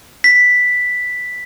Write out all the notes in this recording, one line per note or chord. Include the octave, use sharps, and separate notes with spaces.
B6